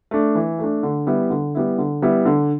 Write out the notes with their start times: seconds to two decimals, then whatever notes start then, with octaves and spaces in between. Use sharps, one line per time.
0.11 A3 D4
0.35 E3
0.59 A3 D4
0.83 D3
1.07 G3 B3 E4
1.30 D3
1.55 G3 B3 E4
1.78 D3
2.02 G3 B3 E4
2.25 D3